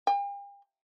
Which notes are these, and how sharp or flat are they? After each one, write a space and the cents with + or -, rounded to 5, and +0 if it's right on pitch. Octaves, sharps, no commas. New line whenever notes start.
G5 +45